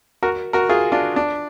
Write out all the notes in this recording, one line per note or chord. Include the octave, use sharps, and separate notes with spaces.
F#4 A#4
F#4 A#4
F4 G#4
D4 F4
D4